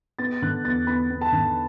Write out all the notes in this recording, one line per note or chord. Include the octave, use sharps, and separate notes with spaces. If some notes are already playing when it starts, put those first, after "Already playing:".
B3 A6
D3 F#6
E2 A6
B3 B5
B3
A5
D3